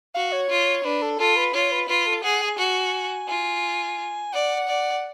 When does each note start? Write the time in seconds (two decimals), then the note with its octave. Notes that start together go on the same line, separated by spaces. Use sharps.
0.15 F#4 F5
0.32 C#5
0.50 F4
0.84 D4 B4
1.02 A4
1.19 F4 A4
1.37 B4
1.54 F4 C#5
1.72 B4
1.89 F4 B4
2.07 A4
2.23 G#4 F#5
2.42 G#5
2.59 F#4 G#5
3.28 F4 G#5
4.33 D5 F#5
4.68 D5